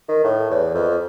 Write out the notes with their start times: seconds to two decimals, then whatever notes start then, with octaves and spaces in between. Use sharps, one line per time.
0.08 D#3
0.24 A2
0.50 E2
0.74 F2